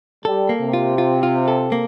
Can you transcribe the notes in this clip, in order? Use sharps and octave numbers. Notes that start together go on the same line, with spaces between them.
G3 A4
A#3
C3
F4
F4
F4
A4
A#3